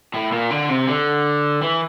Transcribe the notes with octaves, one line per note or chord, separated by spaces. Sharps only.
A2
A#2
D3
C3
D3
E3